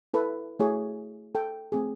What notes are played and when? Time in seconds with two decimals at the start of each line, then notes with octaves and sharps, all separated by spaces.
0.14 E4 A4 B4
0.60 A3 E4 F#4 G#4 C#5
1.35 A4 G5
1.72 A3 C4 G#4